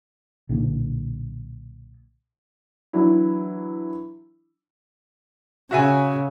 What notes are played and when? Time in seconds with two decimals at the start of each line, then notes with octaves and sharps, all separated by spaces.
0.49 B1 A#2 D3
2.93 E3 F#3 D4 E4
5.71 C#3 F#4 E5 G#5